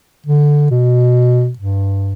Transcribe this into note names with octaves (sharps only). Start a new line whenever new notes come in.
D3
B2
G2